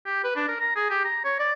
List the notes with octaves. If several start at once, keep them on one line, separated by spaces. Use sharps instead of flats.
G4
B4
D4
A#4
A#5
G#4
G4
A#5
C#5
D5